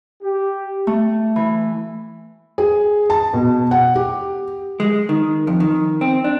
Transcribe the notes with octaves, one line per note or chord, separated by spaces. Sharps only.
G4
A3
E3
G#4
A5
B2
F#5
G4
G#3
D#3
F2
D#3
C4
D4